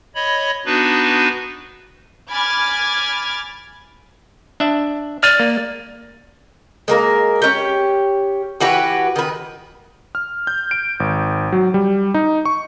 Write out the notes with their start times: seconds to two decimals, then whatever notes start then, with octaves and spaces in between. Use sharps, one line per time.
0.15 C#5 D#5 B5
0.65 B3 D4 D#4 F#4 B4
2.30 G#5 B5 D6 F6 G#6 A6
4.60 D4 E5
5.23 D5 F6 A6 D#7
5.39 A#3
6.88 G#3 A#3 A#4
7.42 C#4 G4
8.61 E3 F#4 G4 B4
9.16 D#3 B4
10.15 F6
10.47 G6
10.71 D7
11.00 G#1
11.52 F#3
11.74 G3
12.14 D#4
12.45 C#6